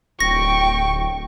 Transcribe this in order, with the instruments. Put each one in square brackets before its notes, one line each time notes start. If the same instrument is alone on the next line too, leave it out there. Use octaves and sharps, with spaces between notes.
[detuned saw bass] D1 [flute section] G5 [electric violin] C#6 [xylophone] A#6